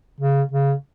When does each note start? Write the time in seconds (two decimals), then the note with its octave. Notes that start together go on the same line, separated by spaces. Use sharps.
0.20 C#3
0.52 C#3